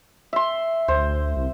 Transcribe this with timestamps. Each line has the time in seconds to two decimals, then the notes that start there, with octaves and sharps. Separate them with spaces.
0.33 E5 C6
0.88 D2 C5
1.36 C2